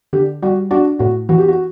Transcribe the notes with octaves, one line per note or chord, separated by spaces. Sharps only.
D3 G4
G3 F#4
D4 F#4
A2 F#4
E3 F#4
G4
F#4